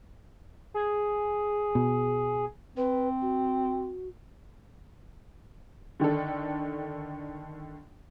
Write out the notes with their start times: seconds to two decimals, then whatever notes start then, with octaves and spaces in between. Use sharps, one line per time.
0.74 G#4
1.75 B2
2.77 C4 B4
3.22 F#4
6.00 D3 D#3 D4 A4